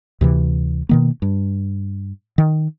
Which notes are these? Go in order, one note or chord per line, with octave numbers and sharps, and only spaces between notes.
D2 C3 E3
B2 D#3 A#3
G2
D#3